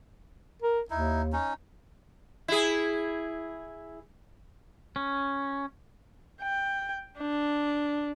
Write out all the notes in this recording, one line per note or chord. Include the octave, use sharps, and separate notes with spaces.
A#4
D#2 D#4 E4
C#4 D#4
E4 G#4
C#4
G5
D4